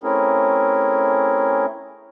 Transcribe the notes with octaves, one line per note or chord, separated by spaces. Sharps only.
A3 C4 C#4 E4 G#4 A#4